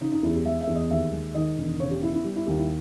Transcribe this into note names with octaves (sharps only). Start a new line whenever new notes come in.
C#3 D#4
D#4
E2 E4
G4
G#3 E5
E5
E2
D#5
D#2 E5
G#3
D#3 D#5
E1
C#3 C#5
G4
B3 E4
E4
G3
E4
D#2 G4
E4